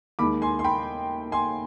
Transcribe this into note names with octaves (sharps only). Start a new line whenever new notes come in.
D#2 D#3 G#3 B5 D6
G#5 C6
C6
G5 B5
G#5 C6